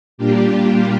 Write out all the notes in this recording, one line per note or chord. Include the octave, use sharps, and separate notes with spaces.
A#2 G3 A#3 D4 F4 G4